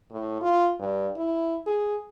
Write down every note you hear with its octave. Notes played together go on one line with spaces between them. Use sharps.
A2
F4
G2
E4
G#4